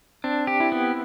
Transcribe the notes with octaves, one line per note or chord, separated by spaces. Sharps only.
C4 D4
G4
E4
B3